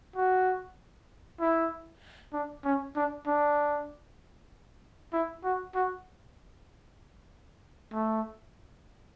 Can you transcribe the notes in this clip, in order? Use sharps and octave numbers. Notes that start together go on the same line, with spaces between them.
F#4
E4
D4
C#4
D4
D4
E4
F#4
F#4
A3